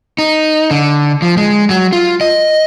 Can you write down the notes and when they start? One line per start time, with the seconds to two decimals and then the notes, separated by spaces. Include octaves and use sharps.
0.18 D#4
0.71 D3
1.22 F3
1.37 G#3
1.70 F#3
1.93 F4
2.21 D#5